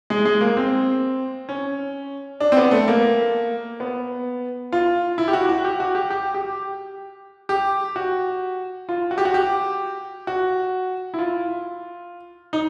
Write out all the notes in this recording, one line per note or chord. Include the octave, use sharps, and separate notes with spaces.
G#3
G#3
A#3
C4
C#4
D4
C4
B3
A3
A#3
B3
F4
E4
G4
F#4
F#4
G4
F#4
G4
G4
G4
G4
F#4
F4
F#4
G4
F#4
G4
F#4
E4
F4
D#4